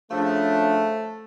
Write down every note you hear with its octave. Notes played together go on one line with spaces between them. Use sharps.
C#3 F3 A3 D4